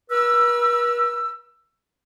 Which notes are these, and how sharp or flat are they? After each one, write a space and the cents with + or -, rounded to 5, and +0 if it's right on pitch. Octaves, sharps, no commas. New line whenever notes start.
B4 -45 E6 +15